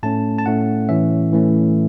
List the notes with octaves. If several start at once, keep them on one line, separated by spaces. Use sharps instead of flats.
A2 A3 C#4 A5
A5
A2 A3 C#4 F#5
A2 E3 C#4 E5
A2 E3 A3 C#4